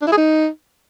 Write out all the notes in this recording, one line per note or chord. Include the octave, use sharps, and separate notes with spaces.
D4
E4
G#4
D#4